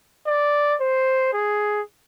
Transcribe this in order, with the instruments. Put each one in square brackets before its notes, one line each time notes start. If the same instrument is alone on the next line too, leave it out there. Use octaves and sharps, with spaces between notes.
[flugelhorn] D5
C5
G#4